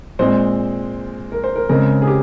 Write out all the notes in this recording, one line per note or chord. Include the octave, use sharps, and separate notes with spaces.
A#2 G#3 C4 C5
A#4
C5
A#4
C#3 G#3 C4 A#4
G#4
G4